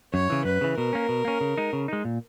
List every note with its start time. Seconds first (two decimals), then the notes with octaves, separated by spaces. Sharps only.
0.13 F#2 C#5
0.30 C#3 E3
0.44 F#2 B4
0.61 C#3 E3
0.77 B2 A#4
0.93 A#3 C#4
1.09 B2
1.25 A#3 C#4
1.41 C#3
1.58 G#3 D#4
1.73 C#3
1.88 G#3 D#4
2.05 A#2